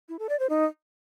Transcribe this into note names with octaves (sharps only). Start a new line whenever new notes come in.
E4
A4
D5
C5
D#4